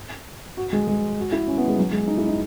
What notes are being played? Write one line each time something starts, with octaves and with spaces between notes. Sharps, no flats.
F#4
G#3
G#3
F#4
E4
C#4
B3
G#3
F#3
G#3
D#4
E4
D#4